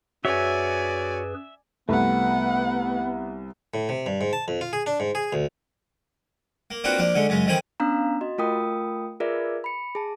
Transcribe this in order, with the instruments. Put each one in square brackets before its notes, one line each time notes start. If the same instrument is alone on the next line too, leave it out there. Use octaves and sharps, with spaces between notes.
[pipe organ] F#2 G#4 B4 [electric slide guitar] F#4 C#5 [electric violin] D5 G#5 [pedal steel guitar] E5
[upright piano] C2 [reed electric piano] A3 [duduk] B3 [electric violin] B4 F#5
[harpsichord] A2
C3
G2
G#2
A5
F2
F4
G#4
D4
G#2
G#4
D2
A#3
A#3 C4 D4 F4 F#4 B4
F3 A#3 D4
D3 G#3 C#4
F#2 C#3 G#3
A1 D#3 F3 C4 G#5 B5
[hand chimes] B3 C#4 D4 F5 A#5
F#4 D#5
A3 F4 A#4 G5 D#6
F4 G#4 A#4 B4 D5 E5
B5 C#7
G#4 A5